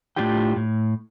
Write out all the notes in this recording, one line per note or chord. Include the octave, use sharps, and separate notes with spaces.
A2 C#4 D4 F4 G4 G5
A2